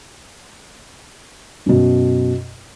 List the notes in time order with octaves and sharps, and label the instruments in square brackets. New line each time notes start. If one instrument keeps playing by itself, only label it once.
[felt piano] F#2 B2